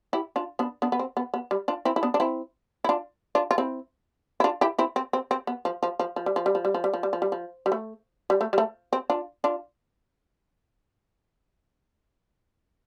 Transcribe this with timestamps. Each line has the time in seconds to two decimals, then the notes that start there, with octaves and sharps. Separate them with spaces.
0.13 E4 G4
0.36 D4 F4
0.59 B3 D4
0.82 B3 D4
0.92 B3
0.99 C4
1.17 B3
1.34 B3
1.51 G3
1.68 D4 F4
1.85 C4 E4
1.96 E4
2.03 B3 D4
2.14 D4
2.20 C4 E4
2.84 E4
2.89 D4 F4
3.35 D4 F4
3.51 F4
3.58 C4 E4
4.40 E4
4.44 D4 F4
4.61 E4 G4
4.79 C4 E4
4.96 C4
5.13 C4
5.31 C4
5.47 B3
5.65 F3
5.83 F3
5.99 F3
6.16 F3
6.26 G3
6.36 F3
6.46 G3
6.55 F3
6.65 G3
6.74 F3
6.84 G3
6.94 F3
7.03 G3
7.13 F3
7.22 G3
7.32 F3
7.66 G3
7.72 A3
8.30 G3
8.41 A3
8.53 G3
8.58 A3
8.93 C4
9.10 D4 F4
9.44 D4 F4